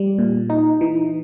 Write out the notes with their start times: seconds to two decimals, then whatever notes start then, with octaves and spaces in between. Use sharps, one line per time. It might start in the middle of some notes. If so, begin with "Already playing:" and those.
Already playing: G3
0.18 A#2
0.50 D#4
0.81 E3